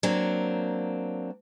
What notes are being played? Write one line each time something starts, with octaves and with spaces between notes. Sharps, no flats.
F#3 A#3 C4 D4